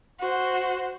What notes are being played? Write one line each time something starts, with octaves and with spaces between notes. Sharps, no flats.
F#4 C5